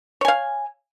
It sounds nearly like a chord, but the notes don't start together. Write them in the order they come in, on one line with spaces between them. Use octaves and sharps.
C#5 G#5 F5